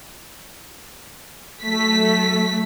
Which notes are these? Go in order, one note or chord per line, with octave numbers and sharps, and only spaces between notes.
F#3 A3 B6